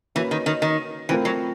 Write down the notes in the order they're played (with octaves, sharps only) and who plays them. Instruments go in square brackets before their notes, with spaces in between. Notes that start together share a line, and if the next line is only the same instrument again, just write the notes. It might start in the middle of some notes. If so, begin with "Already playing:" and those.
[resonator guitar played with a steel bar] E3 [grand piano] A#3 C#4 F#4 B4
[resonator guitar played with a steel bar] D#3
D#3
D#3
[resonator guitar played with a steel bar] E3 [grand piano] A3 C4 F4 A#4
[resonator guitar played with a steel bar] F#3